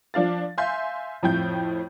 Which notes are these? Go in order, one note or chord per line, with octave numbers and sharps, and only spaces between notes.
F3 D4 F5 A6
E5 F5 G#5 C6 G6
F2 A2 F3 G5 G6